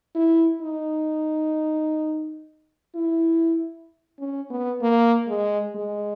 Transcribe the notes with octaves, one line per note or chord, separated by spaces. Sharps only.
E4
D#4
E4
C#4
B3
A#3
G#3
G#3